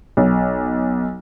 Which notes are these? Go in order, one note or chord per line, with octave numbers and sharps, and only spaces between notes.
B1